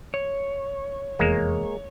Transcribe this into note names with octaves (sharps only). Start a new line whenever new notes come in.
C#5
F1 E2 G#3 A#3